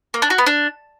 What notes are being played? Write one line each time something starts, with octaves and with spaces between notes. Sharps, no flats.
A#3
D4
F#4
B3
D4